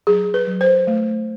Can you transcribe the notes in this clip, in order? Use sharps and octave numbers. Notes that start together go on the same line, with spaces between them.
F#3 G#4
B4
F#3
C5
A3